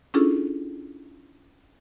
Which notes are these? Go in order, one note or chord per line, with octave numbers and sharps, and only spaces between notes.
C#4 D4 E4 F4 G#4 A4